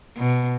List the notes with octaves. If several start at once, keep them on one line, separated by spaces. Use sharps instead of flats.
B2